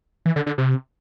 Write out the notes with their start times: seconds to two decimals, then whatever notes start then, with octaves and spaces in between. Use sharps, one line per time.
0.26 E3
0.36 D3
0.46 D3
0.58 C3